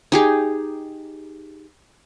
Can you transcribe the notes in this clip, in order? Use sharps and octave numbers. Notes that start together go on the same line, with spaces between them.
D#4 G4 G#4